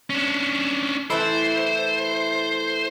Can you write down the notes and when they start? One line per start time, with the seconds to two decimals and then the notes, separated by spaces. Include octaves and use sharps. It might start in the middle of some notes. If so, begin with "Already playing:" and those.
0.10 C#4 D4
1.10 E3 A3 E4 C5